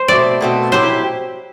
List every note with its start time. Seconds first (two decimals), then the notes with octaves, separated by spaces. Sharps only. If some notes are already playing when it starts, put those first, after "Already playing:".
Already playing: C5
0.08 B2 A3 C4 D5
0.41 B2 A3 C4
0.72 F#3 C4 E4 G4 C5